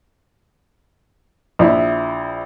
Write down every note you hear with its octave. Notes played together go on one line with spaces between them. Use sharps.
A#1 E4